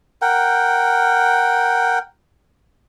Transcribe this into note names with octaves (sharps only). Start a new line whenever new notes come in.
A#4 F#5 G5